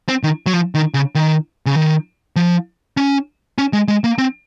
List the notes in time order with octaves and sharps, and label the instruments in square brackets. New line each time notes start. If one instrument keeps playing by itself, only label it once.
[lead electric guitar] C4
D#3
F#3
F3
D#3
C#3
D#3
C#3
D#3
F3
C#4
C#4
G#3
G#3
A#3
C4